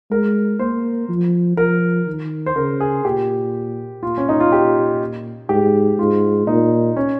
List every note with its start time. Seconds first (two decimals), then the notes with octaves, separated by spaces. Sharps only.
0.11 G#3 A#4
0.59 A#3 C5
1.09 F3
1.57 F3 A#4
2.07 D#3
2.46 C5
2.56 C#3 A#4
2.80 G#4
3.05 A#2 G4
4.02 A#2 F4
4.17 C#4
4.29 D#4
4.40 F4
4.52 G4
5.49 G#2 G4
5.99 G#2 F4
6.47 A#2 D#4
6.96 C#4